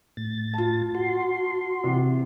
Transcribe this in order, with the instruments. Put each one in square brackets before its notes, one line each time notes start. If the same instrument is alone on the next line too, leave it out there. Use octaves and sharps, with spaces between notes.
[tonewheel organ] A2 A6
[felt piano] F4 A5
[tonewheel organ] F#4 C6
[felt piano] C3 E3